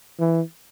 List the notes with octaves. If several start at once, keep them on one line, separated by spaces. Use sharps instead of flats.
E3